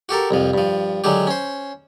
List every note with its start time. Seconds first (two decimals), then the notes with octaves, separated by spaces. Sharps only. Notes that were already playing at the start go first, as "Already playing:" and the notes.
0.09 F#4 G4 A4 A#4
0.31 C2 F2 F3
0.54 G2 F3
1.04 D3 F#3 G#3 G4
1.27 C#4 C5